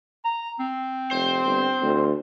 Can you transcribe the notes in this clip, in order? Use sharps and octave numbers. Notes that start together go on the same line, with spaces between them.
A#5
C4
F1 C5
G1
D2